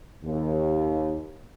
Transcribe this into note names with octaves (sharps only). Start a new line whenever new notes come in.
D#2